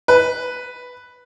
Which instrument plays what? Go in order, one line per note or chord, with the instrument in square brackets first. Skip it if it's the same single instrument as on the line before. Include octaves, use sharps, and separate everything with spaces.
[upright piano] B4